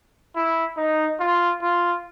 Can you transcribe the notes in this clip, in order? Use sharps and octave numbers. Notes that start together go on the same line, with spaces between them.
E4
D#4
F4
F4